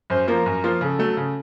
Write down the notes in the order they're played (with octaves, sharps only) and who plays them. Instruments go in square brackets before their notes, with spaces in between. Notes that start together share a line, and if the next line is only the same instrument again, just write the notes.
[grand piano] F#2 [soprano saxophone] C5
[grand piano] F3 A#3 F4 [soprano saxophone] A#4
[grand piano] F#2
F3 A#3 F4
[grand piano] C#3 [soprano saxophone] A4
[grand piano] F#3 A3
C#3